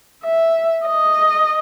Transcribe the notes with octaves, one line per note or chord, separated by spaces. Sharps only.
E5
D#5